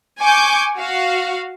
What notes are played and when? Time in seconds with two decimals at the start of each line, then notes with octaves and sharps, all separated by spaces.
0.21 G#5 C#6 D6 G6
0.77 F#4 F5